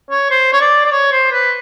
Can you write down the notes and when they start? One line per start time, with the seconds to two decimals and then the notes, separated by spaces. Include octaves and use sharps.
0.11 C#5
0.31 C5
0.53 C#5
0.61 D5
0.86 D5
0.92 C#5
1.12 C5
1.32 B4